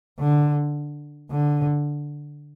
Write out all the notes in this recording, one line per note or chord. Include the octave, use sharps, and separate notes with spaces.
D3
D3